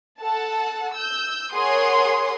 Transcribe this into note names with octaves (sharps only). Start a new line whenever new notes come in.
A4 F#5 A5
E6 G6
G#4 A#4 C#5 F#5 C6 D#6